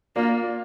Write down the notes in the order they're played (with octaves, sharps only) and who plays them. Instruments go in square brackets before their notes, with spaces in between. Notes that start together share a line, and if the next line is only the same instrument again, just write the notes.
[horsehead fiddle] A#3 [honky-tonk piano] D4 F4